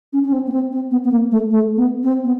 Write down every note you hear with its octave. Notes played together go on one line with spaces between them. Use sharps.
C#4
C#4
C4
B3
C4
C4
B3
B3
A#3
A3
A3
B3
C4
B3